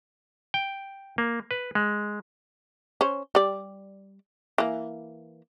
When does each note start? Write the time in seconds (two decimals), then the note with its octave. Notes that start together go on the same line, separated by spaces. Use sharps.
0.54 G5
1.18 A#3
1.51 B4
1.75 G#3
3.01 C#4 C5
3.35 G3 D5
4.58 E3 A#3